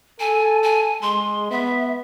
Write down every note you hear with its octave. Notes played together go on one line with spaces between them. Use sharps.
A4 G#5
G#5
G#3 C6
B3 E5